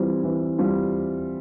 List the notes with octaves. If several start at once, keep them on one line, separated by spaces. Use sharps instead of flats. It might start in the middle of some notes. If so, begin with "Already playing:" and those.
Already playing: E3 G3 C4 F4
E3
G3 C4 F4